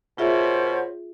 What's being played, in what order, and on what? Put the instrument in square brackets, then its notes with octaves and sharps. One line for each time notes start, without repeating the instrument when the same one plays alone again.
[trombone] B2 [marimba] F4 G#4 E5 [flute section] A#4 C5 C#5